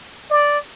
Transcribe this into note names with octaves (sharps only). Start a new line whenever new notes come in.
D5